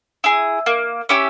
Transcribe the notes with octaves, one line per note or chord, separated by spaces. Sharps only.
E4 G#4
A#3
C#4 E4 G4